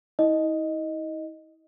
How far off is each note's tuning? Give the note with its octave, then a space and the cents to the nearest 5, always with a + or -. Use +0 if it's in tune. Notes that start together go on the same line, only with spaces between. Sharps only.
E4 -45 D#5 +0